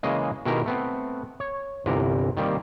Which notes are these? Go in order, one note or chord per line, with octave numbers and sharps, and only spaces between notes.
C#3 E3 G#3 A#3 D#5
B2 D#3 G#3 E4 G4 A#4
A3 B3 C4
C#5
G1 C2 C3 E3 A#4
D#3 G3 A#3 C4